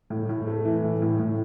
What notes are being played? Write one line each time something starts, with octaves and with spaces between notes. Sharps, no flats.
A2
A2
A3
E3
A2
A2
A2